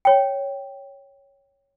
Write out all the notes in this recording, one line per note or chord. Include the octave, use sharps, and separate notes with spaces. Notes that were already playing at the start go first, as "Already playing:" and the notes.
C#5 G5